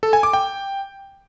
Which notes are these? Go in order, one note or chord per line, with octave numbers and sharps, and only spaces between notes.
A4
G#5
D6
G5